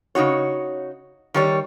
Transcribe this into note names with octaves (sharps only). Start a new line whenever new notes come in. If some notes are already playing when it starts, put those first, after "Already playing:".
C#3 D#4 F#4 C#5
D#3 G3 C#5